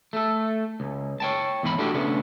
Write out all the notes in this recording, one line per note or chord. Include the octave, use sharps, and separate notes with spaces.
A3 A4
C#2
C#5 G5 A5
E2 G#2 A4 B5
A3 D4 E4 F#4 G4
C#3 A3 B3 D4